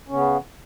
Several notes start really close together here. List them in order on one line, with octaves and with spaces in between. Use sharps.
C#4 C#3 B3